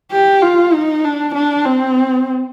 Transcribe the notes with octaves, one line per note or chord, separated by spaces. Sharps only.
G4
F4
D#4
D4
D4
C4